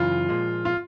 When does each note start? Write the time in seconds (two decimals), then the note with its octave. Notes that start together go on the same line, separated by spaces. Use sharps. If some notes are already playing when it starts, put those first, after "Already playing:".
Already playing: F#2 C#3 E3 F4
0.29 A#2 F3 G#3
0.65 F4